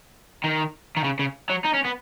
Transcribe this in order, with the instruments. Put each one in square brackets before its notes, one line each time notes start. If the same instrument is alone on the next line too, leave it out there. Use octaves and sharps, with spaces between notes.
[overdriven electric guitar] D#3
D#3
C#3
C#3
F#3
D#4
C#4
B3